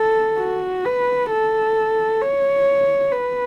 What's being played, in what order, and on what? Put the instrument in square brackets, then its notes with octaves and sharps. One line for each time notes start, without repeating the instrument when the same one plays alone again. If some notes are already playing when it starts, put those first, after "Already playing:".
Already playing: [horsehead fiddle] A4
F#4
B4
A4
C#5
B4